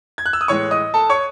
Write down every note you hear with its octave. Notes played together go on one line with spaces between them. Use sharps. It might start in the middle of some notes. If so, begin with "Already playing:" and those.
G#6
F#6
E6
D#6
A2 E3 G#3 C#5 C#6
D#5 D#6
A4 A5
C#5 C#6